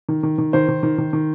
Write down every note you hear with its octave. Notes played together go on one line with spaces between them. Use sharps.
D#3
D#3
D#3
D#3 C5
D#3
D#3
D#3
D#3